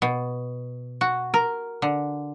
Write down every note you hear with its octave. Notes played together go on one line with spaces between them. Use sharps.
B2
F#4
A#4
D3